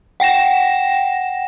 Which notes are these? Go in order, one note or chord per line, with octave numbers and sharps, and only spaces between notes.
F#5 G5 A#6 E7